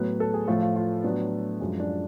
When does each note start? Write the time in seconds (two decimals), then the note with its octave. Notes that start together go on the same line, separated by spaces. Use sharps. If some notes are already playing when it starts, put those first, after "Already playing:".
Already playing: A2 F#3 B3 B4
0.20 A4
0.34 G#4
0.48 A2 F3 A3 F4
0.62 F4
0.76 F4
1.04 A2 F#3 B3 D4
1.61 F#2 F3 G#3
1.80 D4
1.88 F4